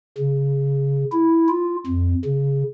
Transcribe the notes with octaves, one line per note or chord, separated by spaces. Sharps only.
C#3
E4
F4
F2
C#3